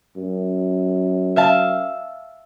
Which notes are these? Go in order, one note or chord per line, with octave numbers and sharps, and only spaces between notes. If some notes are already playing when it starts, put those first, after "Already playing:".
F#2
E5 F5 A5